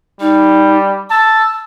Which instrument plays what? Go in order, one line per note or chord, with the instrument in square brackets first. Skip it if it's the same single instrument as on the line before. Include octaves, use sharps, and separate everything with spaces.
[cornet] G3 [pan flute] D#4
[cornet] A5 [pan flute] E6